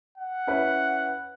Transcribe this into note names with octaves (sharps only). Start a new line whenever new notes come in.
F#5
C#4 E4 B4